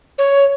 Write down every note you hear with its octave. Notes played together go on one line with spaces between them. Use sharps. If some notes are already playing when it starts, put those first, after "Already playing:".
C#5